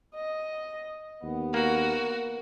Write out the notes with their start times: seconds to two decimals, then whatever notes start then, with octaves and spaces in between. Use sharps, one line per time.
0.15 D#5
1.23 D#2 B3
1.54 A#3 F#4 A#4